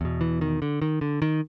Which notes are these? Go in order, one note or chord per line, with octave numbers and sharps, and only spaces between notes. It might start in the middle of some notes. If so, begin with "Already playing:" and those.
E2 B2
E3
D#3
D3
D#3
D3
D#3